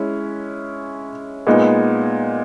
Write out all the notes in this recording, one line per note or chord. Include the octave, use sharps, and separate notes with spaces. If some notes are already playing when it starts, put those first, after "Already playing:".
Already playing: G#3 C#4 E4
A#2 G#3 B3 D#4